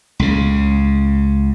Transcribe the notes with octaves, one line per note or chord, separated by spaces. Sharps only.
C#2 C#3